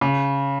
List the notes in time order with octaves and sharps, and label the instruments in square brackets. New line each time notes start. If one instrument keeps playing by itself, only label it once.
[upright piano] C#3